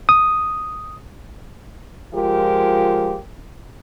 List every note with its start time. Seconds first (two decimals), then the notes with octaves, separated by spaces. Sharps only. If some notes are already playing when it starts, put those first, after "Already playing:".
0.09 D#6
2.14 F3 G#3 F4 G4 A#4